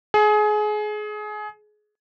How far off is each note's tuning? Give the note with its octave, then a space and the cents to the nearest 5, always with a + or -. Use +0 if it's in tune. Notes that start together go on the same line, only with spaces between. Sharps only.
G#4 +25